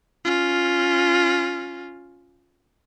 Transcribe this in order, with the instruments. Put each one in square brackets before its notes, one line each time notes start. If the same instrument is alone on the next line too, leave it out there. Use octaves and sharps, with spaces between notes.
[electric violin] C#4 F4